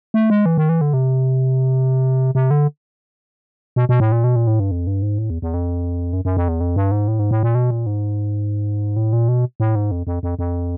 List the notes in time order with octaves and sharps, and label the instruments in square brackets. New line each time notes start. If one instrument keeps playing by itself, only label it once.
[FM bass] A3
G#3
E3
D#3
E3
D3
C3
C3
D3
B2
B2
A2
A#2
B2
A#2
A2
G2
F2
G2
G#2
A2
E2
E2
F2
F#2
F#2
F2
E2
F2
G2
G#2
A2
G#2
A2
A#2
B2
A#2
G#2
A2
A#2
B2
A2
G#2
F2
F2
F2
F2